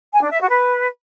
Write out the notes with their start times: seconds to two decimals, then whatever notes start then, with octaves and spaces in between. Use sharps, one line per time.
0.14 G#5
0.22 D4
0.31 E5
0.40 F#4
0.49 B4